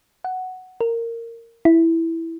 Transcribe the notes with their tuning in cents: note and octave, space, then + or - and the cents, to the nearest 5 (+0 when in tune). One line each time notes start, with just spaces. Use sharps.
F#5 +5
A#4 -15
E4 +0